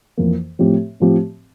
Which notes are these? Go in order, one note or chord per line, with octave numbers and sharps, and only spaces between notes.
F2 E3 A#3
A2 F3 C4 G4
A2 F3 C4 G4